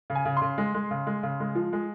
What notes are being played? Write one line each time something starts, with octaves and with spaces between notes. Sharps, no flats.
C#3
G#5
C#3
C#3 C6
G#3
G#3
C#3
G#3
C#3
G#3
F3
G#3